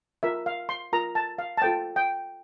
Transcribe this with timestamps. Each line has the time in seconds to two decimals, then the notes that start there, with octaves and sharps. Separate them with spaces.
0.23 F4 A#4 E5
0.46 F5
0.69 C6
0.93 F4 A#4 A#5
1.15 A5
1.38 F5
1.57 A5
1.61 F4 A4 C5 G5
1.96 G5